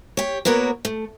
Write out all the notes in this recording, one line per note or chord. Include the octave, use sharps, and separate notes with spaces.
G4 C#5
A#3 B3 F#4 A#4 C#5
A3